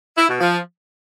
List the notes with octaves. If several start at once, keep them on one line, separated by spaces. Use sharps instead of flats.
E4
B2
F3